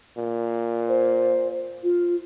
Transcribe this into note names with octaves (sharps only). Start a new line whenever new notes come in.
A#2
C5
F4